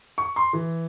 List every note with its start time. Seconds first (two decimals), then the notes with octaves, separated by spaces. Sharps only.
0.18 C#6
0.36 C6
0.53 E3